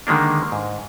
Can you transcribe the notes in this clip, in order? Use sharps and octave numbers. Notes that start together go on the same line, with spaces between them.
D3 D#3 G#3 A#3 D4
G#2